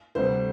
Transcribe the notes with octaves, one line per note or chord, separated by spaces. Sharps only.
D2 C3 G3 C5